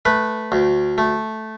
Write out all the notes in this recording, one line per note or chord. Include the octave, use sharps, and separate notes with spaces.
A3 B4
D2
A3